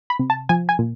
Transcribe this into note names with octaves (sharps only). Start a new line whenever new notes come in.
B5
C3
A5
F3 G#5
G#5
A#2